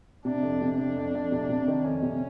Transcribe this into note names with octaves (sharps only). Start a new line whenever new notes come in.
C3 D4
F2
C3
F2 D4
F2
F2
C3
C3
D#3
F2 C#4
C3